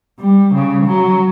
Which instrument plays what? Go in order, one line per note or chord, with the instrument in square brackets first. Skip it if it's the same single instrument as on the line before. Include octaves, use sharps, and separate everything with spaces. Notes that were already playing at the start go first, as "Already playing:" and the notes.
[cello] G3
C#3
F#3